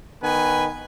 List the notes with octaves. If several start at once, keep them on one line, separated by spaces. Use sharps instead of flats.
D#3 B3 B4 G#5